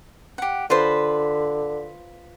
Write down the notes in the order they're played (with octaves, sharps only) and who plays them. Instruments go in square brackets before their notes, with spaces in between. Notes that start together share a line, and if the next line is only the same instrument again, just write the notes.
[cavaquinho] G4 F#5
[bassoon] D3 [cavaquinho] F4 B4 C5